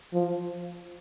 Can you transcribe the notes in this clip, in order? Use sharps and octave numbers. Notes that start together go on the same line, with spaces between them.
F3